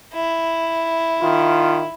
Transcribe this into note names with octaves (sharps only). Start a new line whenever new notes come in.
E4
D#3 F4